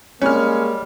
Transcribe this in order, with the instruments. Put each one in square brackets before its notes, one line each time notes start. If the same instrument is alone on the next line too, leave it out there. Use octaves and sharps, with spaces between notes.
[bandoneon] G3 [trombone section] G#3 A#3 [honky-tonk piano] C#4 F6 [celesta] C#5